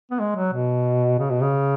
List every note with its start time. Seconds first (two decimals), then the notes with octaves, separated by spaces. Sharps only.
0.11 B3
0.20 G#3
0.36 F#3
0.53 B2
1.19 C#3
1.30 B2
1.41 C#3